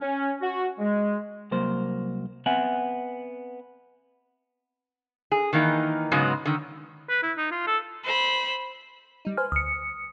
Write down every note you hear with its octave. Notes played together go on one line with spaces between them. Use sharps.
C#4
F#4
G#3
C2 F#3 A#3 C5
B3 C4 E5 F#5 G#5
G#4
D#3 E3 A#3 D#4
G#2 C#3 F#3 G#3 B3
D3 D#3
B4
E4
D#4
F4
A4
C5 B5
G3 D#4
B4 C5 G#5 F6
D2 D#6 C#7